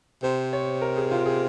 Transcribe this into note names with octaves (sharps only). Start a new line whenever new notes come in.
C3 C5
C#5
A#4
G#4
F4
G#4